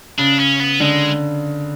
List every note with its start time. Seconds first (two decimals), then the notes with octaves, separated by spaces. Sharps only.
0.18 C#3 D4
0.39 C#4
0.60 B3
0.80 D3 G#3